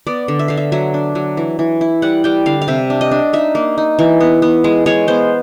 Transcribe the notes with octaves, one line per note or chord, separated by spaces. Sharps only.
B3 D5
D3
E5
D3 F5
E5
F#3 E5
D4
F#3
E3
E3
E4
G3 F#5
G3 G5
D3 F5
F5
C3 E5
D4
D#5
D4
D#4 E5
A#3
D#4
E3
B3
B3
G#3
G#3 C#5
B3 C5